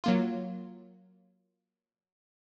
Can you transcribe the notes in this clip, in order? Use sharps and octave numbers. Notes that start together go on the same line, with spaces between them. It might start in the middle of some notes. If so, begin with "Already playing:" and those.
F#3 A#3 F4